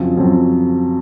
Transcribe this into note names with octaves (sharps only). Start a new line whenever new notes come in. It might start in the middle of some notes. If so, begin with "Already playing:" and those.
Already playing: F2 C#3 F#3 C4 F#4
F2 C#3 F#3 C4 F#4